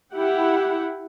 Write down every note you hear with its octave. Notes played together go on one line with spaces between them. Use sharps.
E4 G4 F#5